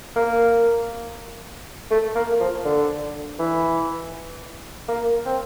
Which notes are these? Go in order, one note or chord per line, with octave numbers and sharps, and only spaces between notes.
A#3
A3
A#3
F3
D3
E3
A#3
C4